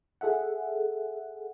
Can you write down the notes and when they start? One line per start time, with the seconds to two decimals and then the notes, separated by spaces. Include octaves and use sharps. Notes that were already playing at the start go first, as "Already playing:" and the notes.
0.21 G#4 A4 E5 F#5